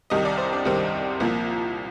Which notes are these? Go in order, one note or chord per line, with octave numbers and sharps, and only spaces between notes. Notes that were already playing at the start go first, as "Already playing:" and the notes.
C2 C3 D#3 G3 D#5
D5
C5
D4
C2 C3 D#3 G3 C4
C2 A#2 F3 A#3